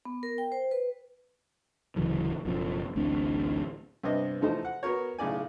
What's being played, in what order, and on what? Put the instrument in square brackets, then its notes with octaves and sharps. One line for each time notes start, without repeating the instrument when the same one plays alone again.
[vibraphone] B3
A#4
G5
C5
B4
[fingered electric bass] D1 C#3 E3 F#3
F#1 B2 F3 C#4
A1 D2 C4 D4
[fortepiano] G2 C3 B3 C4 D4 D#5
E3 F3 A3 D#4 A4 C5
F#5
B3 F#4 A#4 C#5
B1 A2 C#3 D5 G#5